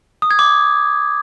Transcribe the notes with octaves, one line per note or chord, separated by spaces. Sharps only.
D#6
G#6
D6